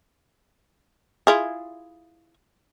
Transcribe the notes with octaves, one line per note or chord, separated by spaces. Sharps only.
E4 F4 G#4